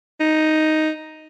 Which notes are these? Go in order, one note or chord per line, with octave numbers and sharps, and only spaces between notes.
D#4